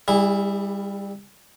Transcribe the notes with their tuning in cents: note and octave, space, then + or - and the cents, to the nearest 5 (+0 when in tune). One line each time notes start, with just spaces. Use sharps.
G3 +20 E4 -10 G#4 -25